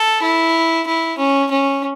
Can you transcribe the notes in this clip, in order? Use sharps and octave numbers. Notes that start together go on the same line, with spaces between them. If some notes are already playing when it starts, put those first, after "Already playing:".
Already playing: A4
E4
E4
C#4
C#4